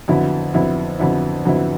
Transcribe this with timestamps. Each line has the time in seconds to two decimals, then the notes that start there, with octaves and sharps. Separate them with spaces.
0.08 F2 D3 F#3 B3 E4
0.54 F2 D3 F#3 B3 E4
0.99 F2 D3 F#3 B3 E4
1.45 F2 D3 F#3 B3 E4